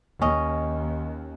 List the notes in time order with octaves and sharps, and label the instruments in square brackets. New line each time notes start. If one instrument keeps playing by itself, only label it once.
[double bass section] D#2 [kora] C#4 D#5